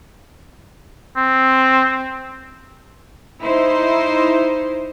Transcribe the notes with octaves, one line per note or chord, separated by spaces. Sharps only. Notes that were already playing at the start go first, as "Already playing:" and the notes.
C4
D#4 E4 C5